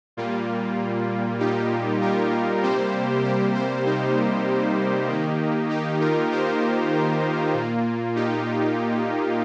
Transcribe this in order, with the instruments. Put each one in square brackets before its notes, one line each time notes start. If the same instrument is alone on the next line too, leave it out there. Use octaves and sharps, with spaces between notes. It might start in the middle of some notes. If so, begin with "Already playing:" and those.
[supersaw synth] A#2 G3 A#3 F4
D#4 G4
F4 A#4
C3 G3 A#3 G4 C5
G4 C5
G4 C5
D#4 G4
D#3 A#3
D#4 G4
F4 A#4
G4 C5
F4
A#2 A#3
D#4 G4